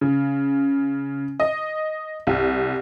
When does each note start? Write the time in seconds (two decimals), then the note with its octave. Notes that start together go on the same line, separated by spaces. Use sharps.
0.01 C#3
1.40 D#5
2.27 C2